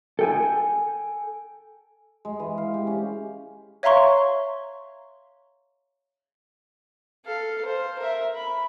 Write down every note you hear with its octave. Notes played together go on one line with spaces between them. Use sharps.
A4 G5 G#5
G#3
E3
F5
G4
C#4
C#5 E5 F5 A#5 C6 C#6
A4 F5
C5
A#4 E5
B5